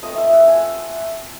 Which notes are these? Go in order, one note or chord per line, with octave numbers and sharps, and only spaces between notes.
A3 C4 F4 D#5
E5
F#5
G#5